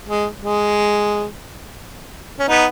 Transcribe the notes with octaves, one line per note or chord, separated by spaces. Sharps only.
G#3
G#3
C#4
B3 D#4